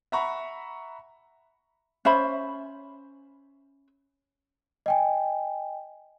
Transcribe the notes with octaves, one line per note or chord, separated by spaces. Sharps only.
E5 F#5 A#5 B5 C#6
C#4 C5 E5 B5
D#5 G5 G#5